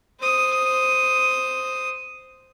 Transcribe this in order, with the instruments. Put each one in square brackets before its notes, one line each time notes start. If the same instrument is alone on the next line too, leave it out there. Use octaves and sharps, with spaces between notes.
[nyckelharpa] C5 D#6